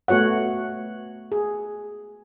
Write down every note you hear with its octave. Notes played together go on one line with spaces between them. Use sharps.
A3 B3 F#4 C#5 F#5
G#4